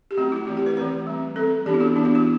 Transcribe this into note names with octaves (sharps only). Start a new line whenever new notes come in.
G4
F#3 A3 C4 F#4
E4
E3 A3 C4 E4
G4
B4
E3 A3 C4 B4
G3 C4
G3 C4 A4
E3 B3 D4 G4
E4
F#4
E3 B3 D4
E4
F#4